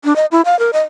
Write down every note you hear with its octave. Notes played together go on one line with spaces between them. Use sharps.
D4
D#5
E4
F5
A#4
D#5